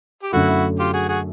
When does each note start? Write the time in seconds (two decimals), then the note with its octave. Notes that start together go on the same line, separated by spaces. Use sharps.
0.23 G4
0.32 F#2 D3 F#3 A3 E4 F#4
0.79 F4 G4
0.93 F#4 G#4
1.09 F#4 G#4